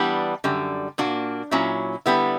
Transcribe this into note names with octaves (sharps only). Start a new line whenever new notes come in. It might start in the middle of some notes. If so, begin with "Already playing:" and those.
Already playing: E3 G3 B3 D4
F#2 D3 G3
A#2 A#3 D4 F#4
A#2 F#3 C#4 E4
D3 G3 B3 E4